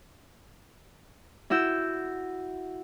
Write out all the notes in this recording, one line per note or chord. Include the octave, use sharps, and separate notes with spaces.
E4 F#4 E6 G6